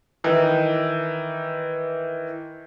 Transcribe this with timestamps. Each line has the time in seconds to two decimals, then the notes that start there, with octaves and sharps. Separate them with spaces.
0.24 D#3 E3